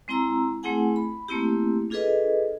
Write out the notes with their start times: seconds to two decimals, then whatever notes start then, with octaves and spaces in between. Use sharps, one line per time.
0.08 G#3 C4 E4 A#5 E6
0.63 A3 C4 E4 G#4 F#5 G#5
0.96 B5
1.28 A3 A#3 C4 E4 G4
1.90 D4 F4 G#4 A4 B4 D#5